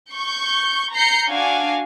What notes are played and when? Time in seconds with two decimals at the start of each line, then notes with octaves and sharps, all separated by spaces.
0.13 C#6 G6
0.94 A#5 G6 C7 C#7
1.31 D4 F#4 F5 G#5